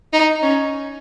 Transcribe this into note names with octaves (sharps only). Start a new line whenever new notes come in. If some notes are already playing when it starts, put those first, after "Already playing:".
D#4
C#4